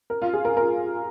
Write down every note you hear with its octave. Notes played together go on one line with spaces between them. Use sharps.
A#4
F4
G#4
A#4
A#4